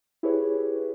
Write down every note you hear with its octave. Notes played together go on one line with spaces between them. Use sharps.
E4 G4 G#4 B4 C#5